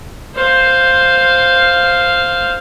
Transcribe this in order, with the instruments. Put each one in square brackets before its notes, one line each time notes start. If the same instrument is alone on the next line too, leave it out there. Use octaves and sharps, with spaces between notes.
[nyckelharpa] C5 F5